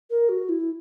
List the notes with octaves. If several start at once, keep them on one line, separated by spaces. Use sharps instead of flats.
A#4
F#4
E4